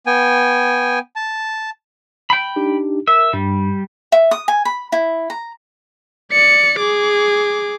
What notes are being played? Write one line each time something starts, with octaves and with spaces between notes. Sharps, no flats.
B3 G5 G#5
A5
G5 B5
D4 D#4 G4
A#4 E5
G2 G3
E5
D#6
G#5
B5
E4
A#5
D5 C#7
G#4 D6